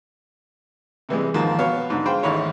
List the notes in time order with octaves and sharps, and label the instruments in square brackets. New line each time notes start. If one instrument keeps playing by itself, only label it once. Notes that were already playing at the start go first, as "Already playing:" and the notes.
[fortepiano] C3 E3 G3 G#3
D#2 G#2 F3 A#3
B2 B3 C#5 F5
G#2 D3
F4 G#4 C5 F5 G5 B5
A1 D#2 G#2 D#4 E4 C#5